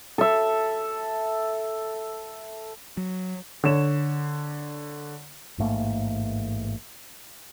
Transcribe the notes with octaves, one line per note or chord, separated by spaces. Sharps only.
A4 E5
F#3
D3 C#5 E7
A1 G#2 A3 A#3